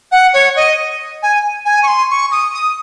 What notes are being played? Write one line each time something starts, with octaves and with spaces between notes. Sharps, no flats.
F#5
C#5
D#5
G#5
G#5
C#6
C6
C#6
D#6
D#6